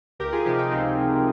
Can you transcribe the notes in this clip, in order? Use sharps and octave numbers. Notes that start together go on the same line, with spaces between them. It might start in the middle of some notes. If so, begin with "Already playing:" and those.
C#2 G4 A#4
F4 G#4
C3 F3 D#4 G4
D#4 G4
C#2 C4 D#4
C3 F3